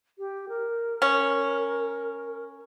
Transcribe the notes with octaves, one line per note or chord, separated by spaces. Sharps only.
G4
A#4
C#4